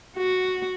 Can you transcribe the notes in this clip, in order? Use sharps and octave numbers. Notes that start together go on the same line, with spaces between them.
F#4